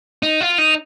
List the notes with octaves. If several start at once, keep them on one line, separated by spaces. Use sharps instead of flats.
D#4
F4
D#4